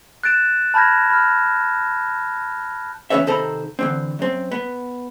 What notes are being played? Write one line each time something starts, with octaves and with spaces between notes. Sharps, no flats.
F#6 A6 D7 E7
A5 B5 F6 G6 G#6 A#6
B5 F6
E2 F3 C#4 B4 C#5 E5
C3 D#3 A4 C5 A#5 B5
D3 E3 C4
F#2 C4
B3